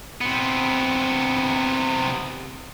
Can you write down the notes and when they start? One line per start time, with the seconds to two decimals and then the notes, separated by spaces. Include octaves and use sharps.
0.21 C3 B3